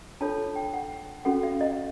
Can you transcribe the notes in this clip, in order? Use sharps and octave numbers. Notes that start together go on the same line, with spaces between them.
D4 F4 A4 C#5 A5
G5
F#5
C#4 F#4 A4 F#5
F5
D#5